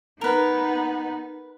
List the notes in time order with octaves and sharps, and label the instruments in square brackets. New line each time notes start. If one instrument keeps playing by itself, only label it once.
[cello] B3 D#4 [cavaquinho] A#4 B4